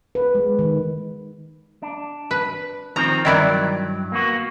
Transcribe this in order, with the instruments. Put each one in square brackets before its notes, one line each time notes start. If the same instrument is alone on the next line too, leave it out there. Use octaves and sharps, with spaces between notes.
[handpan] B4
G#3
D#3
[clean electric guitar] D4
[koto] B4
[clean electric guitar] D#3 F3 C4 [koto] A#5
[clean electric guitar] G2 F#3 [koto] D#3 E4 D5
[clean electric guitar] A#3 B3 F#4